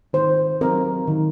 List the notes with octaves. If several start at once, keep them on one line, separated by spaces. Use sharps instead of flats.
D#3 C5
F#3 C4 A#4
D#3